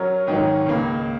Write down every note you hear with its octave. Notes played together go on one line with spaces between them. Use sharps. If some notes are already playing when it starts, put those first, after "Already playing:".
Already playing: F#3 C#4 A#4
G#2 D#3 F#3 C#4
C#2 C#3 A#3